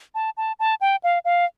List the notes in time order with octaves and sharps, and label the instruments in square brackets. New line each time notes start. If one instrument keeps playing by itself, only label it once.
[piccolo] A5
A5
A5
G5
F5
F5